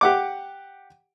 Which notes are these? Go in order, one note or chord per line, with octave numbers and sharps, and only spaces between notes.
G4 F#5 D6